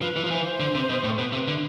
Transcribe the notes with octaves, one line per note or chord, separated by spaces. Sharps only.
F3 B4
E3
F3
E3 C5
D3
C3
B2
A2
A4
B2 B4
C3 B4
D3